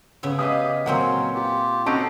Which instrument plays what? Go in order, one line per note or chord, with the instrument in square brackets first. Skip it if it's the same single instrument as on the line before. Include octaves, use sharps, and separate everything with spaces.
[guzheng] C#3 B3 E5
[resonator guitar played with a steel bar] G#3 B4 D#5 [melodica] G4 F5 [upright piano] D#6
[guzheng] A#2 A#3 C4 [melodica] F#3 C#4 [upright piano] F#5
[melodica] F4 G4
[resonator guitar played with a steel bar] C4 C#4 [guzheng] D#4 [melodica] F#4 A4 D#5 [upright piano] A5 D7